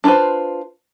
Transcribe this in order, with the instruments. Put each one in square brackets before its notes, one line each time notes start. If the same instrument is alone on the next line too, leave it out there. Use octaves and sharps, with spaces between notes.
[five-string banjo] D4 F4 A4 B4 C5